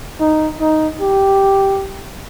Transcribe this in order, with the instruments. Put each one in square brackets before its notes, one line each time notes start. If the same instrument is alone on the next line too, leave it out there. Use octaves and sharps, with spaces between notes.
[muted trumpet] D#4
D#4
G4